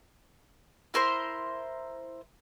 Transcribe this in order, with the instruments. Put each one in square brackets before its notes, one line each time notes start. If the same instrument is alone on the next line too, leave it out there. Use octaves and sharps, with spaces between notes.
[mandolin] E4 A#4 C5 C6